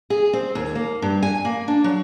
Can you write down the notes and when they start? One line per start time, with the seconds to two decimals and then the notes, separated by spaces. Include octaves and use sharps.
0.10 G#4
0.33 C4
0.55 D#2
0.75 A#3
1.02 G2
1.23 G#5
1.45 A#3
1.68 D4
1.84 F#3